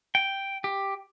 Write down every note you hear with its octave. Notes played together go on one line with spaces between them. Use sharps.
G5
G4